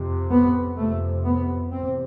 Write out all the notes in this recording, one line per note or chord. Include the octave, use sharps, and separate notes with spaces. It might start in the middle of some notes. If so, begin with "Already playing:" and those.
Already playing: F2 C3
B3
F2 C3 A3
B3
E2 C3 C4